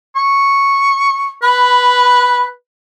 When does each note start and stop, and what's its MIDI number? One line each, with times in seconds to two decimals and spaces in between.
0.16 1.35 85
1.43 2.49 71
1.43 2.45 83